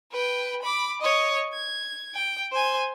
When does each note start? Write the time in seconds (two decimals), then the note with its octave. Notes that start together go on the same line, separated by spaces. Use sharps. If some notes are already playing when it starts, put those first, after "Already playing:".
0.12 B4 G5
0.62 B5 D6
1.02 C#5 D#5
1.53 G#6
2.15 G5
2.52 C5 G#5